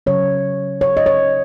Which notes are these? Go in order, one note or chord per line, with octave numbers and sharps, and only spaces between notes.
C#3 F#3 C#4 C#5
C#5
D#5
C#5